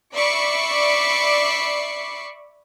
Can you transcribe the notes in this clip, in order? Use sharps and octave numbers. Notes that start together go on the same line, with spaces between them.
D5 E5 B5 C#6 D6 C7